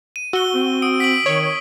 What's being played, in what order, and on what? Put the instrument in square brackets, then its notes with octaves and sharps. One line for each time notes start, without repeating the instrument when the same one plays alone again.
[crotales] D#7
[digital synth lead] F#4 [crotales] E6 G7
[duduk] C4
[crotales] D#6 D7
B6 D7 F#7
[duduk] D#3 [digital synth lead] C#5